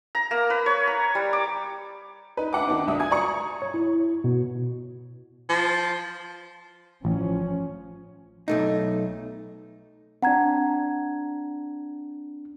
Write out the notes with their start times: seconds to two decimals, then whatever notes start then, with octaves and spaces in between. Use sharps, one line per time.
0.15 A#5
0.31 A#3
0.50 B4
0.66 C#5
0.87 A#5
1.15 G3
1.33 D6
2.37 D#4 B4
2.53 D4 E5 F#5 D6
2.67 D#3 B3 D4 D#4
2.87 C2 E5 D#6
3.00 G#5 D#6 G#6
3.11 D5 A#5 C#6 C#7
3.62 C#5
3.74 E4
4.24 B2
5.49 F3
7.05 A1 F3 C#4
8.48 B1 A3 D#4
10.23 C4 D4 F#5 A#5 G#6